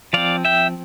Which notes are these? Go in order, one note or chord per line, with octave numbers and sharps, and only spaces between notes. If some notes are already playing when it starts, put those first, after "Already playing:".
F3 C4 D5 F5
E5 G5